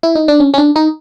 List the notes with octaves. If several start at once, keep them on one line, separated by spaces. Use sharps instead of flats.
E4
D#4
D4
C#4
C#4
D4
D#4